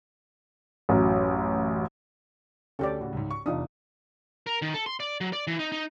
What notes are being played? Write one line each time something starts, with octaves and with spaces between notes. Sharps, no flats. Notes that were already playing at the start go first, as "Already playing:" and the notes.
A1 F#2
D2 C#4 G4 A4 D5
A2 C#3 F#4
C#2 G#2
C#6
F1 E2 D4 D#4 F4 D#6
A#4
D#3
A4
C6
D5
F#3
D5
E3
D#4
D#4